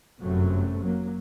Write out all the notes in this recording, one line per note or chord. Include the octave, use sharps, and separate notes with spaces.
G1 F#2 C3 F#3 A3
F#3 A#3